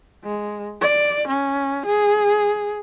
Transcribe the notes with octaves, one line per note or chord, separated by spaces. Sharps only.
G#3
D5
C#4
G#4